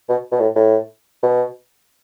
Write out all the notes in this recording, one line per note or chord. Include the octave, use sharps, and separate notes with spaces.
B2
B2
A2
A2
B2